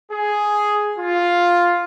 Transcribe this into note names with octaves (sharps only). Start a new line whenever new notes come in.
G#4
F4